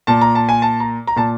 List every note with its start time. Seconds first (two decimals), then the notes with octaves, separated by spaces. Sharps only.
0.07 A#2 A5
0.21 A#5
0.35 A5
0.49 G#5
0.62 A5
0.80 A#5
1.07 A#5
1.16 A#2 A5